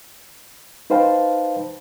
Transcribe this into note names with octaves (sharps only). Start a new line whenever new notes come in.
D#4 B4 C5 F5 G5 A5